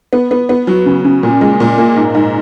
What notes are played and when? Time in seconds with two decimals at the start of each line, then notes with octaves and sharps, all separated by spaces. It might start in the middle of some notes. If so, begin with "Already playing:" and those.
0.13 B3
0.31 B3
0.49 B3
0.67 F#3
0.86 C#3
1.05 C#3
1.23 A#2
1.41 G#3
1.60 A#2
1.78 A#3
1.96 G#2
2.15 G#2